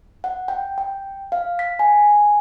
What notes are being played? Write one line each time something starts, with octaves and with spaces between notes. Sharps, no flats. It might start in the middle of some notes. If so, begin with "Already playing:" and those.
F#5
G5
G5
F5
B6
G#5